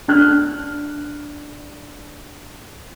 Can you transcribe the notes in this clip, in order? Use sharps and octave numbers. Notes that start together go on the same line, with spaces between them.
D4 F6 F#6